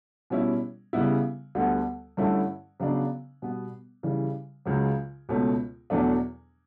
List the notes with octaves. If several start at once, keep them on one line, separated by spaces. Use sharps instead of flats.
B2 G3 C#4 E4
C#3 G3 B3 E4
D2 D3 G3 B3
G2 D3 A3 C#4 E4
C#3 F#3 B3 D4
B2 G3 B3
C#3 E3 G3
C#2 C#3 F#3
C#2 B2 A3 C#4
E2 B2 F#3 A3 D4